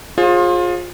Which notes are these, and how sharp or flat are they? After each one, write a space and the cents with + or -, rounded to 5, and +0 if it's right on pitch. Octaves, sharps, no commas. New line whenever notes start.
F4 +25 G#4 +0 C5 +40